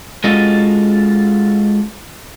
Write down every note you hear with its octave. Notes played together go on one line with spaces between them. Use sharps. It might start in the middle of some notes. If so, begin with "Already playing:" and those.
G#3 C#4 F4 F#4 A4 D#5